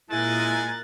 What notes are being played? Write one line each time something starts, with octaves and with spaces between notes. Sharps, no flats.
A#2 G#3 E4 A#4 G#5 F#6 A6